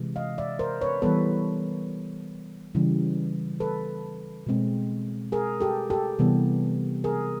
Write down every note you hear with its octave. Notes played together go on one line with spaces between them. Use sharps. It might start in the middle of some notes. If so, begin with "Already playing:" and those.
Already playing: C3 E3 G#3
D#5 F5
D5 E5
A#4 C5
B4 C#5
E3 G3 B3 A4 B4
C#3 E3 G3
A4 B4
B2 G#3 C4
G#4 A#4
G4 A4
G4 A4
C3 E3 G3 B3
G#4 A#4